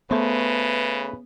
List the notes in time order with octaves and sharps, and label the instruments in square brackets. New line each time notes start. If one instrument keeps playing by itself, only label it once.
[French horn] C#3 [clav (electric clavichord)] A3 C5 [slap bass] B3 [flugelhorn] B4